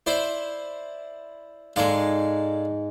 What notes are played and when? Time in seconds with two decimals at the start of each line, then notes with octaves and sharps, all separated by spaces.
0.06 E4 C5 D5
1.76 G#2 G#3 A4 D5 F5